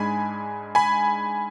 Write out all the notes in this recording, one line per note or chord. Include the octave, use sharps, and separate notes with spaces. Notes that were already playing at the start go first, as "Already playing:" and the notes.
Already playing: G#2 G#3 D4 G#5 B5
G#5 B5